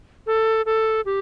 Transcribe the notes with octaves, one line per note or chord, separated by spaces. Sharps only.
A4
A4
G4